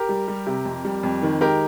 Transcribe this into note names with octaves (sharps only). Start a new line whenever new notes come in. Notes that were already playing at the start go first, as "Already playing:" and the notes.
Already playing: G4 A#4
G3
G3
C3
F2
G3
F2
D#3
G#3 G4 A#4